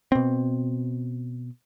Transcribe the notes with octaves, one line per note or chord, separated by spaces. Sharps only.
B2 C4